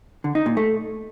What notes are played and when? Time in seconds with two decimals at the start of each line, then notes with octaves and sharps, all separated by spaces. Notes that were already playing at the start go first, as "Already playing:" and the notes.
0.24 D3
0.35 D#4
0.46 A#2
0.57 A3